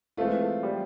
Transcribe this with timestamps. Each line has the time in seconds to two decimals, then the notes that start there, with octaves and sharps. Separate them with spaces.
0.17 E3 G#3 A3 C4 F4
0.41 A3
0.63 G3